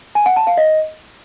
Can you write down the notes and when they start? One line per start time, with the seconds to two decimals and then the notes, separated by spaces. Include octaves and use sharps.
0.15 G#5
0.26 F#5
0.36 A5
0.47 F5
0.58 D#5